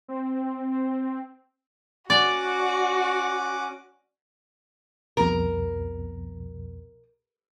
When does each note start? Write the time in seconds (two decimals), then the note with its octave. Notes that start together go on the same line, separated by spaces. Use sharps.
0.08 C4
2.10 C#4 F#4 D5 F#5 D6
5.17 C2 F2 B2 A#4